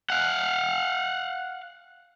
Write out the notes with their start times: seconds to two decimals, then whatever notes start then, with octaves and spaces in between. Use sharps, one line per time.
0.10 F5 F#5